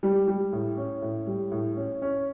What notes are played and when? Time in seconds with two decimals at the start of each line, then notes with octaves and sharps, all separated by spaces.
0.03 G3
0.28 G3
0.53 A2
0.77 C#4
1.02 A2
1.27 G3
1.52 A2
1.77 C#4
2.02 C#4